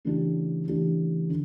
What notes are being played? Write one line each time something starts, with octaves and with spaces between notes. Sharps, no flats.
C#3 E3 A3 D4 G4
C#3 E3 A3 D4 G4
D3